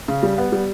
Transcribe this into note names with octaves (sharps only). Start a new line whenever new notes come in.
C#3
G3
B3
G3